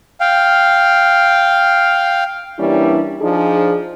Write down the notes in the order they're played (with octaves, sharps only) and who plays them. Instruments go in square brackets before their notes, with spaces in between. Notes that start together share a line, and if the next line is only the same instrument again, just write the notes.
[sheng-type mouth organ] F5 G5
[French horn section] E3 G3 A#3 C#4 D4 E4
F3 D4 D#4 G#4